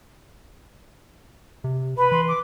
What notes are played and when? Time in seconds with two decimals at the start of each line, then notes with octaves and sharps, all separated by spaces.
1.64 C3
1.97 B4 B5
2.12 E3 C6
2.28 D6